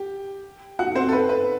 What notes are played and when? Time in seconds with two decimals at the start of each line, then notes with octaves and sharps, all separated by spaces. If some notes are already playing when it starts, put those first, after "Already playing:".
Already playing: G4
0.79 F#4 F#5
0.95 C4 C5
1.09 A4
1.13 B4
1.29 B4